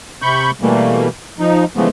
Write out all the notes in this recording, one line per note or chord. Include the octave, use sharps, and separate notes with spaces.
C3 B5 C#6 G6
B2 E3 G3 A3 A#3
F3 D#4
C#3 E3 F3 G#3 A3 B3